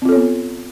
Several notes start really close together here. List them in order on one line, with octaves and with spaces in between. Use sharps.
C4 F4 A4 C#5 B3